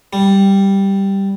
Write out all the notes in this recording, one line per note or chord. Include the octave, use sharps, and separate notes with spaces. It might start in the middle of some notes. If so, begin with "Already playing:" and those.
G3